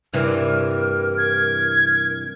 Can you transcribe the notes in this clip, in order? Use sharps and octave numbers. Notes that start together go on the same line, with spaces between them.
G2 C3 E3 A#4
G#6